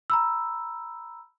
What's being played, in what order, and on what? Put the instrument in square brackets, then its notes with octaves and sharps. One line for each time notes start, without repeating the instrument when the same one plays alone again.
[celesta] A#5 B5 E6